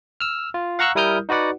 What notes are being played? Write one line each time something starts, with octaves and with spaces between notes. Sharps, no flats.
E6 F6
F4
F5 F#5 A#5 C#6 E6 F#6
G3 E4 A#4 D#6 F6 G6
D#4 F#4 B4 D5 F#5